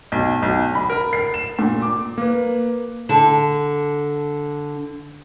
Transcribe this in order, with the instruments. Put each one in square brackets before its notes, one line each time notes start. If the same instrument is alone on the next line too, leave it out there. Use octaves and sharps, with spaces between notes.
[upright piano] B1
B1
B5
A#4
C7
E7
A#2
D6
[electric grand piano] A#3 B4
[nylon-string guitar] D3 A5